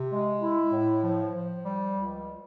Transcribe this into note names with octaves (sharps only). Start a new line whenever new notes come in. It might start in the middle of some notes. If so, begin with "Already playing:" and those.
Already playing: C3
G#3
E4
A2
F3
F3
G3
C#2